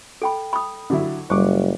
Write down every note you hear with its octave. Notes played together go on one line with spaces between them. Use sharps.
A4 G5 B5
B5 D#6
D3 F#3 E4
F#1 G3 C5 C#6 D6